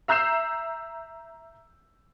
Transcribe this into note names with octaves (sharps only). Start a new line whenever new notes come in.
E5 A#5 E6 G6 C7 E7